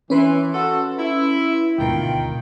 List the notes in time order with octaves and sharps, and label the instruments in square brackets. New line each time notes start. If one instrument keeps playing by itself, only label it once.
[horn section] E3 [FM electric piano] C#4 B4 C6
[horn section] F#4 A4
E4
[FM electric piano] D2 G#2 B2 [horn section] D#3 F4 G5